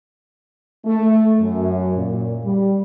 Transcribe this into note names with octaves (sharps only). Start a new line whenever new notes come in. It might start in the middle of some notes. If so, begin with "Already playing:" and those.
A3
F#2
A#2
G3